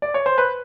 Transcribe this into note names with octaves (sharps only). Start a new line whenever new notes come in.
D5
C#5
C5
B4